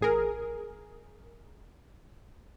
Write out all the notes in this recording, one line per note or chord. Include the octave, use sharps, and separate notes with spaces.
A1 G#4 A#4